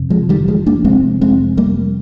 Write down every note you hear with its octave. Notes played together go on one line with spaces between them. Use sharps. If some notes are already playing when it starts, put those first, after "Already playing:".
Already playing: F2 C3
F3 G#3
D#3 G3
F3 G#3
A#3 D4
F2 C3 G#3 C4
G#3 C4
G3 A#3